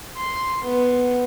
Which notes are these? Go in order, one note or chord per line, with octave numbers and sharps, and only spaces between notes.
C6
B3